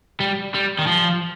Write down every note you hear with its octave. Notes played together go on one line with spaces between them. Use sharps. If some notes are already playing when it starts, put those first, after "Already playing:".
G3
G3
D#3
F3